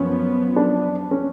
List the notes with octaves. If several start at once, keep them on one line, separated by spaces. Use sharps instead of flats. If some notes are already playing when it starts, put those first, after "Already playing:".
Already playing: F#2 F3 B3 C#4
D4
C#4